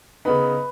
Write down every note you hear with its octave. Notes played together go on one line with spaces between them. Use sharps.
C#3 B3 D#4 B4 B5